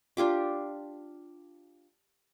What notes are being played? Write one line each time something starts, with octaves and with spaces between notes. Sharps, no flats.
D4 F4 G4 D6